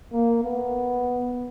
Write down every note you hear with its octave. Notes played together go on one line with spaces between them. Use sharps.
A#3
B3